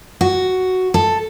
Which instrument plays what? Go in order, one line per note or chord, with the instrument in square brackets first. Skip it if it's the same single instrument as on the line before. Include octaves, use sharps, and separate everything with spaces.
[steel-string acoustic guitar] F#4
A4